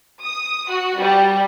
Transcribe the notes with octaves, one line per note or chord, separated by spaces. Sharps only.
D#6
F#4
G3